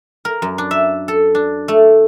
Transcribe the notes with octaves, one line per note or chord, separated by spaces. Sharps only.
A#4
F#2
D4
E5
A4
D4
A3